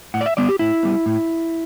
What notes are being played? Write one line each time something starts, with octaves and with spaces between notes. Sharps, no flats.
A2 F#5
D5
E5
G3 B3 D5
G4
A2 E4
G3 B3
A2